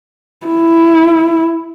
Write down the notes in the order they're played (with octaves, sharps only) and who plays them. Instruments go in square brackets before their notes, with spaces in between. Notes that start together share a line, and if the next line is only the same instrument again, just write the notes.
[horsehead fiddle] E4